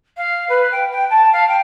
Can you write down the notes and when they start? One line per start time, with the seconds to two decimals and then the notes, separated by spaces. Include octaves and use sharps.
0.17 F5
0.49 B4
0.71 G5
0.91 G5
1.10 A5
1.33 F5
1.48 G5